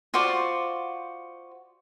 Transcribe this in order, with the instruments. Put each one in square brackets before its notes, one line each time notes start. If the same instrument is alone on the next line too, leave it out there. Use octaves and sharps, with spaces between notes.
[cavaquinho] F4 F#4 C5 D5